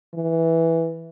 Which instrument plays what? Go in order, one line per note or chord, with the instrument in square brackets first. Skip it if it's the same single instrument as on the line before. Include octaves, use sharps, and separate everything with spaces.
[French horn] E3